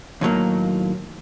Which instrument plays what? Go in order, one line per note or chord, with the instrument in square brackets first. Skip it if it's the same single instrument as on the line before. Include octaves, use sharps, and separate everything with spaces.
[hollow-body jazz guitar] D#2 A2 F#3 A#3